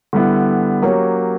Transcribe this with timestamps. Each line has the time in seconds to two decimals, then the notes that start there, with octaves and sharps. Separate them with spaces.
0.13 D3 G3 B3 E4
0.82 F#3 A#3 C#4 G4 C#5